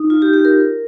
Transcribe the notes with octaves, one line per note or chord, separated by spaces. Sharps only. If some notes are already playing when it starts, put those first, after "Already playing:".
Already playing: D#4
F4
G4
G4
A#4